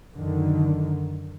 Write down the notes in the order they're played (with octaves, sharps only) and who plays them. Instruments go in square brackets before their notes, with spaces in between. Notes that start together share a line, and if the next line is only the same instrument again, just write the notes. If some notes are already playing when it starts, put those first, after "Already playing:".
[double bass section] F#2 D3 D#3